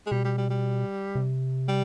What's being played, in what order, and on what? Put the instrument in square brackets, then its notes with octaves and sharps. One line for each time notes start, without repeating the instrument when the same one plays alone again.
[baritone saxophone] G#3
[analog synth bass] B2 [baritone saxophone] G3
[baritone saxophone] G3
G3
G3
[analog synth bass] C3
[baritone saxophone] G3